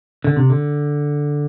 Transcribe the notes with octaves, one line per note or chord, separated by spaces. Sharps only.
D3
C3
D3